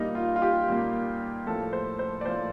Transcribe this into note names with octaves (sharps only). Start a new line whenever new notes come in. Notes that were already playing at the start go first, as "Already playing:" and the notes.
Already playing: A#2 G3 A#3 D#4
F4
F4
G4
A#2 G3 A#3
A2 F3 A#3 A4
C5
C5
D5
A2 F3 A#3 C5